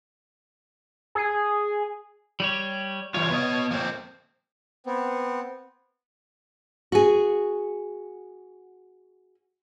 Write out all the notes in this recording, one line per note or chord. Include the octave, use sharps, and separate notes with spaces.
G#4
G3 G4 C#5
E3 G3 F4 C#5
B3 D#5
F3 A#3 C4
B3 C4
F#4 G#4